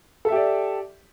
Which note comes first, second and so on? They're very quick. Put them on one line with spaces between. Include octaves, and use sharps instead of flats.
A4 E5 G4 D5